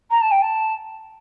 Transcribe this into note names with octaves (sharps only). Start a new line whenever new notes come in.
A#5
A5
G5
A5